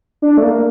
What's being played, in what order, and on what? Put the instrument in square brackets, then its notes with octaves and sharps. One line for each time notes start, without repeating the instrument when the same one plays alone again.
[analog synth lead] D4
A3
A#3